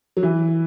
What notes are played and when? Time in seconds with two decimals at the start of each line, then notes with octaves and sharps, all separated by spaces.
0.17 F#3
0.23 E3